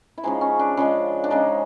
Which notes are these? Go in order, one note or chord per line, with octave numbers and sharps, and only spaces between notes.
E4
C#3 F3 G#3 D#4
C#4
D4
C#3 F3 G#3
D4
C#3 F3 G#3 D#4